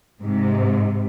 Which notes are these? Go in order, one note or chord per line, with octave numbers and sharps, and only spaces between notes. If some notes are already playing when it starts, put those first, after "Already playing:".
G#2 C3